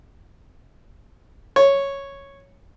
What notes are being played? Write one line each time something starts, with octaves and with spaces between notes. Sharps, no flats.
C#5